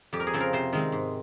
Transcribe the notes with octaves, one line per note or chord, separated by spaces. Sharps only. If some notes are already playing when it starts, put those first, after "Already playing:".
F2 G4
A#4
G#4
C#3 F3 C4
A#4
C3 C5
D#3 G#3 C4
G#2